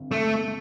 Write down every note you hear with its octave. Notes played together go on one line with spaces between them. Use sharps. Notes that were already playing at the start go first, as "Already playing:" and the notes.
Already playing: G1 C4
A3